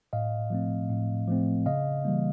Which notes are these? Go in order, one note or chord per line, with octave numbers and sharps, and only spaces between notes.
A2 D#5 F5
F3 A3 C4
A2
F3 A3 C4
C#3 D#5 F5
E3 G3 A#3